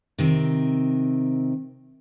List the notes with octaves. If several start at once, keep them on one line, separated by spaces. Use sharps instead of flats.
C3 D#3 C4